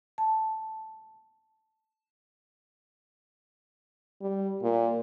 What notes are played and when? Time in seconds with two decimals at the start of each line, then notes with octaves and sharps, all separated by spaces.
0.18 A5
4.22 G3
4.63 A#2